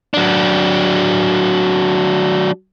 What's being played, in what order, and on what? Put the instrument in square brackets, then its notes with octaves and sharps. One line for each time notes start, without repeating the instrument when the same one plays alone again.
[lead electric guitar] F#3 D4